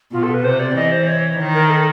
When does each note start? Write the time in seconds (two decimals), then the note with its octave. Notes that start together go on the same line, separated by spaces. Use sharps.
0.12 B2 F4
0.23 A4
0.34 B4
0.44 C3 C5
0.59 D5
0.75 E3 D#5
0.91 C5
1.07 C#5
1.37 D#3
1.54 A#4
1.69 A4